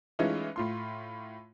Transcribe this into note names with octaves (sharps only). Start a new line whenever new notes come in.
E3 G#3 A3 C#4 D#4 F4
A2 F4 C6